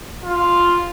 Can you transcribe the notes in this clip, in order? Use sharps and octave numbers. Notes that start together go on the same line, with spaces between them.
F4